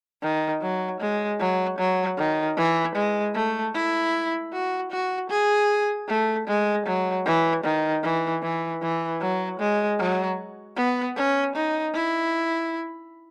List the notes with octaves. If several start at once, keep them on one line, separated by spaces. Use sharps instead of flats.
D#3
F#3
G#3
F#3
F#3
D#3
E3
G#3
A3
E4
F#4
F#4
G#4
A3
G#3
F#3
E3
D#3
E3
E3
E3
F#3
G#3
F#3
B3
C#4
D#4
E4